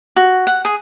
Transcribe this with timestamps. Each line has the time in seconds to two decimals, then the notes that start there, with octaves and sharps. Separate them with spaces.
0.16 F#4
0.47 F#5
0.65 G#4